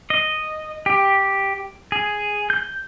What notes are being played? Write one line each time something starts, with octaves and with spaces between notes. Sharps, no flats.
D#5
G4
G#4
G6